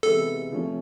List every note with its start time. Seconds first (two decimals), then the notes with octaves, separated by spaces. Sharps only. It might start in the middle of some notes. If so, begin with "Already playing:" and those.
0.03 C3 E3 G#3 B3 A4
0.51 C3 F3 A3 C#4